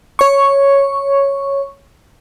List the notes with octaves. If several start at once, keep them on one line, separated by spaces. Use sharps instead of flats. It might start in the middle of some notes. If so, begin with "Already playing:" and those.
C#5 C#6